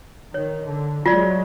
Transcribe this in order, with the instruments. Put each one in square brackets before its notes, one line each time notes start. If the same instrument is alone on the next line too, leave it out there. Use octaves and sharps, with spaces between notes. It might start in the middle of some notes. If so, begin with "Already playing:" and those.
[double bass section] D#3 [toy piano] C#5
[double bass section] D3
[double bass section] F#3 G#3 [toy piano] F4 D5